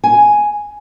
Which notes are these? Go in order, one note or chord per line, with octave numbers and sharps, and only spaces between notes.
G#5